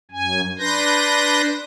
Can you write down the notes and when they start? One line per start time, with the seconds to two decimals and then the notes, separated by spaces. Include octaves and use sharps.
0.11 F#2 G#5
0.59 D4 B4 C6 G6 A#6